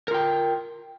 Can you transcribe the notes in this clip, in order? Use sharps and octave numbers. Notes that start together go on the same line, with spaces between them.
F4 A#4 G5